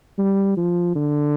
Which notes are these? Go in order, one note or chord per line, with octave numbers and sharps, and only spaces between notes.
G3
F3
D3